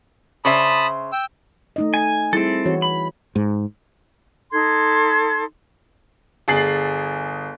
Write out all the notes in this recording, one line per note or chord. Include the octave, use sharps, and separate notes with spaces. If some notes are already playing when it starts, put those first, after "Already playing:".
C#3 C5 E5 A5 B5 D#6
G5 E6
A3 D#4 D#5
G#5
G3 C4 E4 G#4 A4
E3 F#4 C#5
B5
G#2
D#4 A4 C6 G#6
G1 G#4 A6 C7 F#7